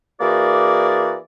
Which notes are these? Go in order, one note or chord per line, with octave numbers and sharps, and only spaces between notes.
E3 A#3 F#4 G#4 D5